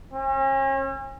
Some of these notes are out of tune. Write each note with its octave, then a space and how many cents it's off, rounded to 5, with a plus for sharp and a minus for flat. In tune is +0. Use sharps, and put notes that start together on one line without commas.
C#4 -40